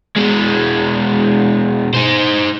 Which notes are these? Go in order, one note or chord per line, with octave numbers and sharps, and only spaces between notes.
B2 G#3
D#4 C5